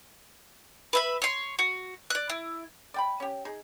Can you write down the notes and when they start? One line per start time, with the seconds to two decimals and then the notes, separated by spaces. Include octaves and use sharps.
0.93 B4 E5 B5
1.22 C#5 C6
1.59 F#4
2.10 D5 F#6
2.30 E4
2.94 D5 G5 B5
3.20 C#4 G4
3.45 D#4 G#4